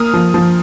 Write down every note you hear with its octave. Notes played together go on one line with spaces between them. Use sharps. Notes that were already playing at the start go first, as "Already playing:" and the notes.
Already playing: A#3 D#6 F6
F3
F3